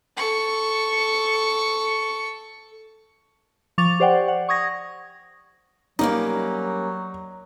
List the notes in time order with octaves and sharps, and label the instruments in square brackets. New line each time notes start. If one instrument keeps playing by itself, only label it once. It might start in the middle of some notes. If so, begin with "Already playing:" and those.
[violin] A4 C#6
[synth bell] F3 C#6 D6 A6 F7
G4 C5 D5 F#5 G5
F#5
C#6 D#6 G#6 A#6
[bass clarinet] F#3 [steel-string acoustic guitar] G3 A#3 C#4 [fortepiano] D#4